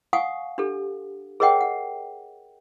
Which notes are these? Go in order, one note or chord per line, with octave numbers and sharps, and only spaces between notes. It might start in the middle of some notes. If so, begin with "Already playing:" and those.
F5 F#5 G#5 C#6 D#6
D4 G4 A4
G#4 A#4 C#5 D#5 F#5 G5
F#5